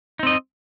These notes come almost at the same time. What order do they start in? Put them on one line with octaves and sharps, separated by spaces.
D#4 C4 D#5